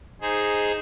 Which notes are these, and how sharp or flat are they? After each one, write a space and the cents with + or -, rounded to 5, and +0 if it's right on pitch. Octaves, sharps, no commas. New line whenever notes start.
D#4 +0 G#4 +0 C5 +0